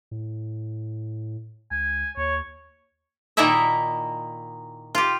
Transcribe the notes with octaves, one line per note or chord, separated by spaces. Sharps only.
A2
C#2 G#5
D#2 C#5
A#2 D#3 A#3 D#4 E4 E5
F4 G4